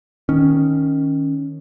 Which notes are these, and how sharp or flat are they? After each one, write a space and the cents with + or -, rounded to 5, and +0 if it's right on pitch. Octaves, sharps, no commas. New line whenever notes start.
D#3 +0 C#4 +0